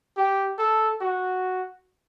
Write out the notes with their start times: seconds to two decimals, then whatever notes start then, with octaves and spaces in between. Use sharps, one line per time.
0.17 G4
0.59 A4
1.01 F#4